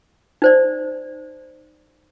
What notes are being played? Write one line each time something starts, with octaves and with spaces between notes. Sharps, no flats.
D#4 C5 D5